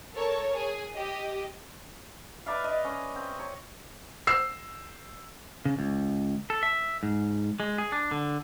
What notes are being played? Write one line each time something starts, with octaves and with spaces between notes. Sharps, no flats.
A4 A#4 C#5 A5
G#4
G4 D#5
B4 D5 E5 F5
D#5
C#4
C4
C#5
E6 C7
C#3
C#2
A4
E5
G#2
G#3
G#4
D4
D3